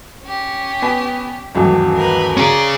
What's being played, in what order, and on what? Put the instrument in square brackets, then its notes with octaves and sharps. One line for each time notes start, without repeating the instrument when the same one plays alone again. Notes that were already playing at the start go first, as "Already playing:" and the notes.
[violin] C#4 G4
[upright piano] B3 G#5 B6
[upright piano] D#1 C#2 E3 [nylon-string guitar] G2 F#3 A3
[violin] A#4 B4
[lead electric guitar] C#4 G#4 [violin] D5 [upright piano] A#5